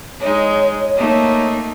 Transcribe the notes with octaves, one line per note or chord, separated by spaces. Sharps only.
G#3 D#4 C#5
A3 A#3 D#4